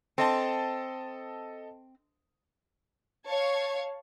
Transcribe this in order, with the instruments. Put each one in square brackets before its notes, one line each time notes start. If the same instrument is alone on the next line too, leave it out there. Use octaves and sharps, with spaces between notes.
[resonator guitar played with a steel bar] C4 [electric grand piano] A4 D#5 A5
[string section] C#5 F5 A5 C#6 G#6